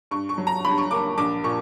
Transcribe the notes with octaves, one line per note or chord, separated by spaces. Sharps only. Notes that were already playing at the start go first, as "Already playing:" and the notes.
G2 C#6
C#6
F#3
A#5
G2 B5
C#6
A#3 D6
A#1 D6
A#2 C#6